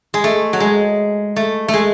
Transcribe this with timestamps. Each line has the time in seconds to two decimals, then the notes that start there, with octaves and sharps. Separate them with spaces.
0.14 G#3
0.24 A3
0.53 F#3
0.60 G#3
1.36 A3
1.68 A3
1.73 G#3